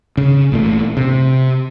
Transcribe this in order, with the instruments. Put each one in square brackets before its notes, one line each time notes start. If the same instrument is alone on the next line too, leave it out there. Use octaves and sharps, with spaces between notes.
[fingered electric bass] C#3
A1 A#2 A3
C3